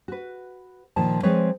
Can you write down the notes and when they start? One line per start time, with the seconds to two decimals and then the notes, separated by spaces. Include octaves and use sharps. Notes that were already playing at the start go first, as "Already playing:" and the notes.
0.08 F#4 B4
0.96 A#2 D#3 F3 A5
1.23 F3 G#3 C4 B4 C#5